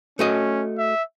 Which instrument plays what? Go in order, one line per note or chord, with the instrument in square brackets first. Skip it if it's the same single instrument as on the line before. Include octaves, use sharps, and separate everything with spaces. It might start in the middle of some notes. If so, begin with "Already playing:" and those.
[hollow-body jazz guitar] A3 F#4 D#5 [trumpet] C#4
[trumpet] E5